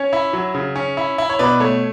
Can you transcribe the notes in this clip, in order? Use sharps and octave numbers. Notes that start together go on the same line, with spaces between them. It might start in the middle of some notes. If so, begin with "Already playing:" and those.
Already playing: C#4 C#5
E4
F#3
C#3
C#4
E4
E4
C#5
B2 B4 D5
A3 C#5